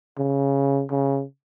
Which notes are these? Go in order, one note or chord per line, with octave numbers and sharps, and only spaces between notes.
C#3
C#3